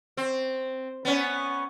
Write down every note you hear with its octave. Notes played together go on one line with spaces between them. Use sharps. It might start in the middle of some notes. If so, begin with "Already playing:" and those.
C4
B3 C#4